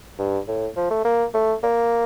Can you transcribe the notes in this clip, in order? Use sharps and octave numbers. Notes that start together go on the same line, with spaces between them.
G2
A2
F3
A3
A#3
A3
A#3